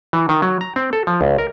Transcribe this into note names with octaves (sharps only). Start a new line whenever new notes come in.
E3
D#3
F#3
A#5
C4
A4
F3
C#2
A#4